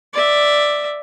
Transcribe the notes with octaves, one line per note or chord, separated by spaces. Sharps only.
D5 E5